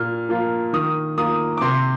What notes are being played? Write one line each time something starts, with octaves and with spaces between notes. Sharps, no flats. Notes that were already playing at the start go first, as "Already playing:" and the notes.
Already playing: A#2 F6
F3 A#3 F4
D#3 D#6
A#3 F4 D#6
D6
C3 C6